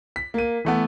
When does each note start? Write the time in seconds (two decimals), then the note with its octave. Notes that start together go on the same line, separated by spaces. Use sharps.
0.16 B6
0.34 A#3 D#7
0.65 E3 A3 B3